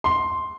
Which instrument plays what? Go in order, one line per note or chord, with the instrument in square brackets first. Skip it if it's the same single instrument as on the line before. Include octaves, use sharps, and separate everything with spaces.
[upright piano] C6